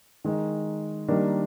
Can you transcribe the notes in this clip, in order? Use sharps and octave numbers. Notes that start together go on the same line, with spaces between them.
D#3 G#3 D#4
D#3 G3 A#3 D4